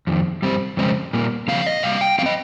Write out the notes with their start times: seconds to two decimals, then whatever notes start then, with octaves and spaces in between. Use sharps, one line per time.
0.07 F2 D#3
0.42 G2 G3 C4
0.77 F2 C#3 G#3 C4
1.13 A#2 G3 A#3
1.48 C#3 F3 C4 F5
1.66 D#5
1.83 C3 G3 A#3 F5
2.01 G5
2.18 F3 C4 F5
2.26 D#5